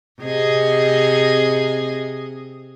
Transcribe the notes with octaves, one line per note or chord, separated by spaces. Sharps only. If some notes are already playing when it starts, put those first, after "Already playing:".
C3 G#4 D#5